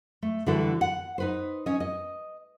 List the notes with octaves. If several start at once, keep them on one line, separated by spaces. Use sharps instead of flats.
A3
D3 E3 G3 E4 F#4 A4
F#5
D#4 B4 C5
C#4 D#5
D#5